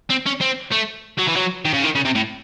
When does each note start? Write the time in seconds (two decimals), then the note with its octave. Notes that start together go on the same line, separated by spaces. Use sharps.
0.10 C4
0.26 C#4
0.41 C4
0.72 A3
1.19 F#3
1.28 E3
1.37 F#3
1.65 D#3
1.74 C#3
1.84 D#3
1.95 C#3
2.05 C3
2.16 A2